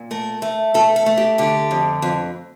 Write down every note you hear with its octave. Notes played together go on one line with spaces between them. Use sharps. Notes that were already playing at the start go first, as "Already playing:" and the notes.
Already playing: A#2
A3 A#4
A3
A3 A4
A4
A3
G4
D3 G4
F2
F2